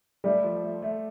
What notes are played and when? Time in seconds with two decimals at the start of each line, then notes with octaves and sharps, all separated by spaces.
0.24 G3 A3
0.44 F3
0.63 A3
0.82 A3